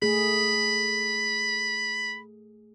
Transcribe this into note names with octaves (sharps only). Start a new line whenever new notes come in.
A3 G#4 B5